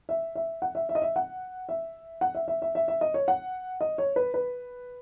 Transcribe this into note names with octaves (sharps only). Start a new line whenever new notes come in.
E5
E5
F#5
E5
E5
D#5
E5
F#5
E5
F#5
E5
E5
E5
E5
E5
D#5
C#5
F#5
D#5
C#5
B4
B4